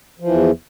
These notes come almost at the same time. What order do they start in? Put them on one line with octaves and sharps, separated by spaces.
F3 E3 E2